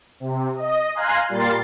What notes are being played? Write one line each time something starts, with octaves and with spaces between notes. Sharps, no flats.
C3
D#5
F5 G#5 A#5 C6 F#6
A#2 G3 A#4 C6 A6